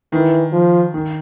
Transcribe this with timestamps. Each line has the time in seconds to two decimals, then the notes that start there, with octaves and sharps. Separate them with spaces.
0.12 D#3 E3
0.53 F3
0.94 D#3